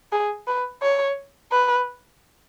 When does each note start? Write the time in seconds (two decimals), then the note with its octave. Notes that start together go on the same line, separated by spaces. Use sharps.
0.12 G#4
0.47 B4
0.82 C#5
1.51 B4